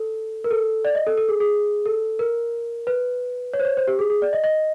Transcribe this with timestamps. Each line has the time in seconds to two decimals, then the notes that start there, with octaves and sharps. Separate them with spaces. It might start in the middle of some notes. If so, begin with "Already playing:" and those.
Already playing: A4
0.44 A#4
0.51 A4
0.85 D5
0.95 D#5
1.07 A4
1.17 A4
1.29 G#4
1.40 G#4
1.86 A4
2.19 A#4
2.87 B4
3.54 C#5
3.60 C5
3.65 C#5
3.77 C5
3.88 G4
3.99 G#4
4.10 G#4
4.22 D5
4.33 D#5
4.44 D#5